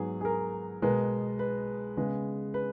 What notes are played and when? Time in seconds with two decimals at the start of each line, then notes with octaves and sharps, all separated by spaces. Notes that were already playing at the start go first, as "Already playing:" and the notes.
Already playing: G#2 F#3 B3 G#4
0.21 G#4
0.25 A#4
0.82 B2 G#3 B3 A#4
1.39 B4
1.97 C#3 G#3 B3
2.54 B4